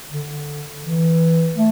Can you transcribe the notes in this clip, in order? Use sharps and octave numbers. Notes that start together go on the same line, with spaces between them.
D3
E3
A3